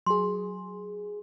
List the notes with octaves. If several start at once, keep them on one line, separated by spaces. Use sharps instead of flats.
F#3 G#4 C6